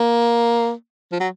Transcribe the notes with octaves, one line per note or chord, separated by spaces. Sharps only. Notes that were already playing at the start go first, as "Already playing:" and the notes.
Already playing: A#3
F3
F#3